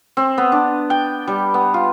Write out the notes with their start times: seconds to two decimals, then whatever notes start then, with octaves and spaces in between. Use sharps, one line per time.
0.17 C4
0.38 B3
0.52 D4
0.90 G5
1.28 G3
1.54 B3
1.74 F4